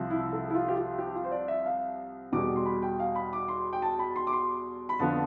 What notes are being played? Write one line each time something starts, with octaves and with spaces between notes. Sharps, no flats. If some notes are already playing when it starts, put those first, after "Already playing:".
Already playing: C2 C3 F3
E4
A4
E4
F4
G4
F4
G4
F4
C5
D5
E5
F5
E2 B2 G3 D6
C6
B5
G5
F5
B5
D6
C6
G5
A5
B5
C6
D6
C6
B5
F2 D3 F3 B3 A5